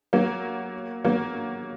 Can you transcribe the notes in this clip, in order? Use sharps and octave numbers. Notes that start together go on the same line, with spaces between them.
F#3 A#3
F#3 A#3